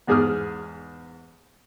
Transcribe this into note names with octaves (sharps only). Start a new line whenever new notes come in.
E2 G#2 G#4 D6 D#6 F6